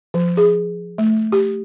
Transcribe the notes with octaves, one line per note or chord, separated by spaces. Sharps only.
F3
G#4
A3
G4